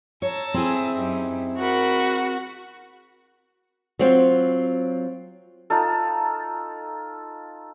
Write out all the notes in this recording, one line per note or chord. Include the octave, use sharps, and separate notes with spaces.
C#5 A5 A#5 E6
C4 E4 G#4
F#2 D#4 G4
F#4 A#4 B5 C#6
F#3 C4 F4
D#4 F4 A4